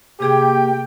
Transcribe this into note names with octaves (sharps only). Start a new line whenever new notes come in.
C3 A#3 G4 G#4 G5 G#6